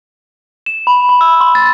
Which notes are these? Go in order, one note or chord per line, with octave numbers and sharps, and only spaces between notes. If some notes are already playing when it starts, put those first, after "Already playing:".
E7
B5
B5
E6
C6
A6